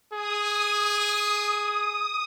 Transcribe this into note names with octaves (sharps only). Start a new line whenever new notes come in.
G#4 D#6